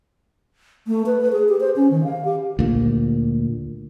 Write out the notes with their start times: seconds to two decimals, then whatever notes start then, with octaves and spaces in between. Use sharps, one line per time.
0.87 A3
1.06 B4
1.21 B4
1.32 G#4
1.49 G4
1.60 C5
1.76 C#4
1.91 D#3
2.04 F5
2.25 G4
2.59 D2 A#2